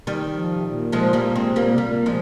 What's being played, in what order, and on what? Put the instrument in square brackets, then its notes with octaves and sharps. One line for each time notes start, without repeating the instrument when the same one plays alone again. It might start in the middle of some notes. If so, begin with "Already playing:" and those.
[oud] D#3 G3
[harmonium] F3
C3
A#2
[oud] F3 G#3
G3 A#3
G#3 C4
G3 A#3
[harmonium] C3
[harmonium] A#2 [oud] G3 A#3
[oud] F3 G#3